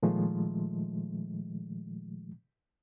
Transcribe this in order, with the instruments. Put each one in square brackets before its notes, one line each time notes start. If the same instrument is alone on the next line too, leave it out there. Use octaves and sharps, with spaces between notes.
[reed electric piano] A#2 D#3 F3 G#3 A3